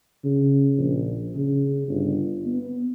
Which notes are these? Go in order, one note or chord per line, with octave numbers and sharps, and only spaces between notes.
C#3
A#1
C#3
G1
B3